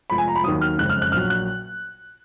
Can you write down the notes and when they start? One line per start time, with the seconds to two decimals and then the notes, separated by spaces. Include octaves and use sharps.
0.10 F1 F2 F3 G#3 B5
0.18 G#5
0.28 A#5
0.35 B5
0.44 D#2 D#3 F#3 D#6
0.61 F6
0.78 F#1 F2 C#3 G#3 F#6
0.90 F6
1.02 F#6
1.12 A#1 A#2 F#3 F6
1.30 F#6